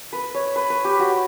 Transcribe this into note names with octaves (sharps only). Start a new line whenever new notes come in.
B4
C#5
B4
B4
G4
F#4